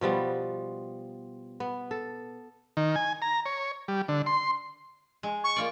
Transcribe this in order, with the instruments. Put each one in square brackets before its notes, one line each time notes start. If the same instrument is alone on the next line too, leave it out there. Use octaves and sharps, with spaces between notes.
[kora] B2 F3 G3 B3
B3
A4
[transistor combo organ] D#3
G#5
A#5
C#5
G3
D3
C6
[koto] G#3
[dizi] C#6
[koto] A#3 F4 D5